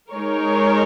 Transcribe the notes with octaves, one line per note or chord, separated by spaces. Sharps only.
G#3 D#4 A#4 C#5